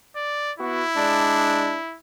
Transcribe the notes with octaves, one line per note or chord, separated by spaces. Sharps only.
D5
B3 E4 F#4
G#3 D4